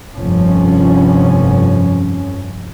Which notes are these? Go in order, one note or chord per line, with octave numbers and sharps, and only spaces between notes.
F1 G2 F3 C#4